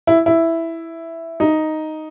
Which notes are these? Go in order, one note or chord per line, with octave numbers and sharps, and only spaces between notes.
E4
E4
D#4